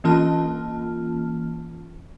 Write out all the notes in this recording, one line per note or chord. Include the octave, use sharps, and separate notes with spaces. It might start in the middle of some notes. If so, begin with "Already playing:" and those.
E3 A#3 C#4 F4 A5 F6